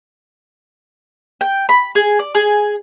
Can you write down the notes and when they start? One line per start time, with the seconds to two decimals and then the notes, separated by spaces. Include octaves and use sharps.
1.41 G5
1.69 B5
1.95 G#4
2.19 D5
2.35 G#4